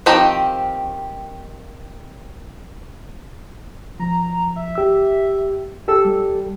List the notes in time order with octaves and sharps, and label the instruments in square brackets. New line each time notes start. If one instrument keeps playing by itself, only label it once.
[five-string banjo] D#3 F3 C4 G4 A#5
[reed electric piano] F3 [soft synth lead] A#5
[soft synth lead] E5
[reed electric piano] G4 E6
[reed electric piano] G4 A4 [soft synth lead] E6
[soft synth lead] G3